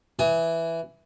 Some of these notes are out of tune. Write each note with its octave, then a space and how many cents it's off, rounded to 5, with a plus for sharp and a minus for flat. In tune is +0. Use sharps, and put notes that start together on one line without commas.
E3 +0 G#5 -5 D#6 +35